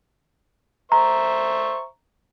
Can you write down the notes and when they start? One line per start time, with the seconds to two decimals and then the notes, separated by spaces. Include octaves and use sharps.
0.92 C5 E5 A#5 C#6